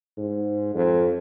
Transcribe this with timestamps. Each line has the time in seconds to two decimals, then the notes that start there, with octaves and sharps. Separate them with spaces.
0.18 G#2
0.75 F2